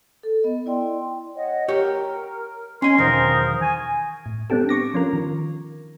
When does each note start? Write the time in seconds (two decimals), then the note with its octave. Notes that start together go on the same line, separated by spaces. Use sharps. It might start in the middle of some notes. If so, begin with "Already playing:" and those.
0.23 A4
0.43 B3 D#5
0.66 E4 D5 G5 C6
1.36 C#5 D#5 F#5
1.68 G4 A#4 C#5
2.82 C#4 D#5 G#5 C6 C#6 G#6
2.98 B1 E2 D#3 A#4 C5 F5 D#6
3.62 G#5 C#6
4.26 A2
4.50 G3 B3 C4 D4 G4 A4
4.69 C#6 D6 A#6
4.94 F3 C#4 F4 A#4
5.13 D#3